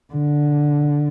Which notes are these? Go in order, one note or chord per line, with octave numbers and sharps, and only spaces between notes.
D3